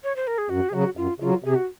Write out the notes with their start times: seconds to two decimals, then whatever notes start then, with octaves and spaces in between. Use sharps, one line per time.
0.04 C#5
0.16 C5
0.27 A#4
0.38 G#4
0.49 F#2 F#4
0.69 G#4
0.73 C#3 F#3 F#4
0.97 F#2 F4
1.20 C#3 F#3 F4
1.44 C3 G#4
1.55 F#4